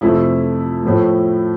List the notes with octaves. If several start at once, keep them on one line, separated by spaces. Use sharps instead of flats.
F2 C3 F3 A3 E4
A2 F3 A3